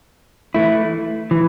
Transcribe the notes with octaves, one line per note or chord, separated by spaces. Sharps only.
E3 A3 E4
E3